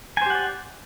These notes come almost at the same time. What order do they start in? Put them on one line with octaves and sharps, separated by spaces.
G#5 C5 G4 F#5 D5